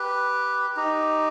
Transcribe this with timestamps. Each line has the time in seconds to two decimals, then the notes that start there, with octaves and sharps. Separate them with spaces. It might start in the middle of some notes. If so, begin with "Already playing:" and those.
Already playing: G4 B4
0.76 D#4 G4